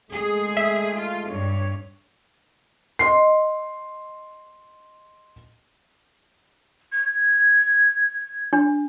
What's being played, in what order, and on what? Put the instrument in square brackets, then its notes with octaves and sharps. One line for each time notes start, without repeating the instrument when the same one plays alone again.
[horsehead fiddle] G#3 A3 [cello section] G#4
[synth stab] E5
[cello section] F4
[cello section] G2 [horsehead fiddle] C#5
[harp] D#5 [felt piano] C6 C7
[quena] G#6
[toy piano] D4